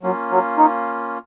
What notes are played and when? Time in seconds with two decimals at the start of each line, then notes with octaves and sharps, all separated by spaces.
0.03 F#3 A#3 C#4 F4
0.31 F#3
0.58 D#4